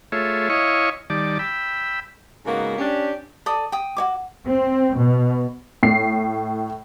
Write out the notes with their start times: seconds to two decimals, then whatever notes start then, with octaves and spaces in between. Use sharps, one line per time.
0.12 A3 F4 G#4 C#5 E5
0.50 E4 C#5 D#5 F5 G#5 C#6
1.10 D#3 G3 D5 A5
1.39 G5 B5 E6
2.45 G#2 C#3 G#3 A#3 B3 F#4
2.79 C#4 D4 G4
3.46 A4 D5 D#6
3.72 G5 D#6
3.97 F#4 C#5 D6
4.48 C4
4.96 B2
5.83 A2 C7